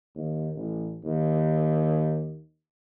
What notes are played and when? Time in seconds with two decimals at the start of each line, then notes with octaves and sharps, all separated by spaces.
0.15 D#2
0.55 A1
1.04 D#2